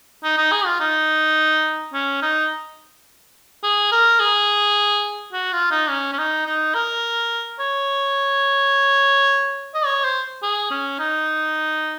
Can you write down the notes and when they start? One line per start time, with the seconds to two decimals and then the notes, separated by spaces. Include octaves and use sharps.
0.23 D#4
0.37 D#4
0.52 G#4
0.66 F4
0.80 D#4
1.93 C#4
2.22 D#4
3.63 G#4
3.92 A#4
4.20 G#4
5.33 F#4
5.52 F4
5.71 D#4
5.89 C#4
6.12 C#4
6.18 D#4
6.46 D#4
6.74 A#4
7.59 C#5
9.74 D#5
9.85 C#5
10.04 C5
10.42 G#4
10.70 C#4
10.99 D#4